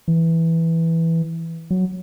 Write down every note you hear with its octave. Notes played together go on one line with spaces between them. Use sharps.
E3
F#3